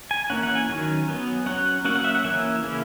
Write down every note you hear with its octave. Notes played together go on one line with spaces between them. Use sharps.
G#5
E3 A#3 C#4 F#5
F#5
G#5
D#3 F#3 C#4
F#3 B3
F#3 C#4 F#5
F#3 A#3 C#4 F#5
F#5
E5
F#5
E3 A#3 C#4 E5
C#3 E3 A#3 C#4